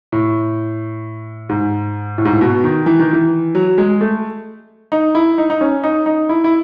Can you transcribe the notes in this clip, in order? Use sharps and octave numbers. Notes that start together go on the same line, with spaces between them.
A2
G#2
A2
G#2
A2
B2
D#3
E3
D#3
E3
F#3
G#3
A3
D#4
E4
D#4
D#4
C#4
D#4
D#4
E4
E4